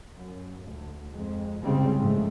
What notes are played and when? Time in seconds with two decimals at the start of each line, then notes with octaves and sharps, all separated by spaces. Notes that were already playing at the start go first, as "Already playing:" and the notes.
0.16 F#2
0.67 D2
1.11 F2 G#3
1.62 F#1 C2 C#3 G3 G#3 C4
1.98 G#2 C#3 F3 G#3 A3